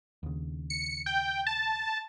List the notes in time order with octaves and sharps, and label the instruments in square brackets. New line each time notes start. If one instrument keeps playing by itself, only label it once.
[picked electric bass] D#2 C#3
[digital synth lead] C#7
G5
A5